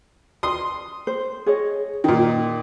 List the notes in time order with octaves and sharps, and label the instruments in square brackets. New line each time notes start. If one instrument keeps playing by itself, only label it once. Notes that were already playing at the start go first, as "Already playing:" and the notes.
[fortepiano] C6 D#6
[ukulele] C5
G#4 C#5 D#5
[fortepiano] A#2 D#3